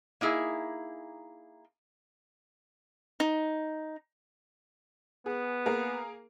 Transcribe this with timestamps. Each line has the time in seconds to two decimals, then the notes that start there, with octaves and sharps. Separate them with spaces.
0.21 A#3 D#4 E4 G#4
3.20 D#4
5.26 B3 G#4
5.66 A#3 G#4 A#4